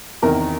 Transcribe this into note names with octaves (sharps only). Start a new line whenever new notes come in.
E2 C3 D#3 A#4